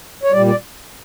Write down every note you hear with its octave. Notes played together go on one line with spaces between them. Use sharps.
C#5
A#2 G3 D5
D5